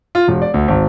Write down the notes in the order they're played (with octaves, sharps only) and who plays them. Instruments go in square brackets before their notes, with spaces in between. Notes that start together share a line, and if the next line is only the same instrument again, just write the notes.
[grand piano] F4
E1
D5
D2
G#1